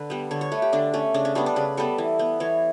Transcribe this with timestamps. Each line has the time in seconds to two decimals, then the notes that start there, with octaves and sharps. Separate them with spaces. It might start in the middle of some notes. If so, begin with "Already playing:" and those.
Already playing: D3 B4
0.10 G3 B3
0.31 D3 C#5
0.41 C#5
0.52 A3 B4
0.62 G4
0.73 D3 D4
0.94 A3 C#4
1.14 C#3 D4
1.25 C#4
1.35 G3 B3 D4
1.46 D4
1.56 C#3 B4
1.77 G3 B3 A4
1.98 E3
2.19 B3
2.40 E3 C#5